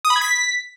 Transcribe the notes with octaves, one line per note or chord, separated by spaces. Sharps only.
D#6
B5
G#6
B6